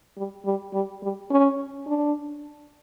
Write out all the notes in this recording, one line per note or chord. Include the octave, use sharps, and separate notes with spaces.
G3
G3
G3
G3
C#4
D4